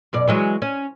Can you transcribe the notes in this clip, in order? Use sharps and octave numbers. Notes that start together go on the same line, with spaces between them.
F#2 B2 D5
E3 F#3 G#3
C#4